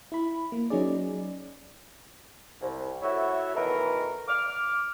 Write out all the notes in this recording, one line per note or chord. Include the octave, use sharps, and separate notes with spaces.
E4 B5
A#3
F#3 C#4 D#4 G#4 D5
C2
A3 E4 F#4 C#5 E5 F#5
B2 D#3 E3 A3 A#4 B4
D6 F6